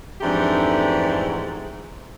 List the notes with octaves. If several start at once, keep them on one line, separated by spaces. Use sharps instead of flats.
F2 G#2 E3 A3 D4 G4